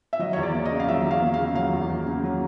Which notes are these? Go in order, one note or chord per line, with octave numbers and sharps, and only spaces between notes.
E5
F#3 D#5
E2 C#5
D5
A#3
D#5
C#3
F5
F#3 E5
E2
F5
A#3
C#3 F5
F#3 F5
E2
A#3
C#3
F#3